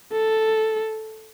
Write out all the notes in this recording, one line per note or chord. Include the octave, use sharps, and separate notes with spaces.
A4